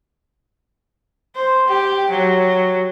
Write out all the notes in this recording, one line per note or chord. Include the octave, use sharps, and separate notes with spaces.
C5
G4
F#3